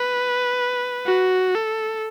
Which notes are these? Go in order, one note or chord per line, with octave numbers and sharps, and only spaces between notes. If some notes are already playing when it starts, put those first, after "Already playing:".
Already playing: B4
F#4
A4